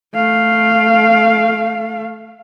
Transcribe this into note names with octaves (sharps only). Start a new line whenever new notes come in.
A3 F5